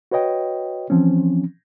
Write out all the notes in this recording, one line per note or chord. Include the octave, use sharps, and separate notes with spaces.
F#4 B4 C#5 D#5 G5
E3 F3 C4 C#4